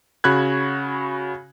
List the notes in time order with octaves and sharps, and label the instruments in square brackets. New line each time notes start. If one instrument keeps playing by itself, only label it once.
[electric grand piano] C#3 F#4 B5 F#6 G#6